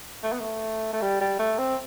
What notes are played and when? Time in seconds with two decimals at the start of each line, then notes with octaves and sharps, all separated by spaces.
0.23 A3
0.32 B3
0.40 A3
0.93 A3
1.01 G3
1.21 G3
1.39 A3
1.58 C4